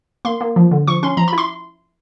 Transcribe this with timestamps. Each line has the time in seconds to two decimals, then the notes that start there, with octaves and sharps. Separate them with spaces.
0.25 A#3 C6
0.41 A#3
0.56 F3
0.71 D3
0.87 F3 C#6
1.03 C#4 C6
1.17 F3 A#5
1.28 E4 B5
1.38 C6